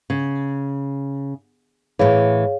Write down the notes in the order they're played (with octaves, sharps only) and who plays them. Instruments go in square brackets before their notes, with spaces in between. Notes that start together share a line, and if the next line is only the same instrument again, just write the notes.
[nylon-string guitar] C#3
[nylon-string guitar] A2 E3 [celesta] G#4 C#5 F5